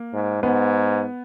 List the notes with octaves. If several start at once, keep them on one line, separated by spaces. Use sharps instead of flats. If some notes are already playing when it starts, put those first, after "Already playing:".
Already playing: A#3
G#2
G#2 B3